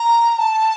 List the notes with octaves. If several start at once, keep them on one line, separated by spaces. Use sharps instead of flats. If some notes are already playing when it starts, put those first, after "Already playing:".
Already playing: A#5
A5